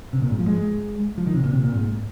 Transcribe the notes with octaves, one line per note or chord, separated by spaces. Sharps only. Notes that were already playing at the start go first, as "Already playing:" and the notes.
C3
A#2
G#2
F3
G#3
F3
D#3
C3
A#2
C3
A#2
G#2